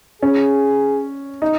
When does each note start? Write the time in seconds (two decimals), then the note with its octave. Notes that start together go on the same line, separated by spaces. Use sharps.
0.22 C#4 G#4
1.42 D#4